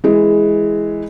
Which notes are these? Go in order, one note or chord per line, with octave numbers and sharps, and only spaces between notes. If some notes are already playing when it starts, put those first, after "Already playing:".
E3 G#3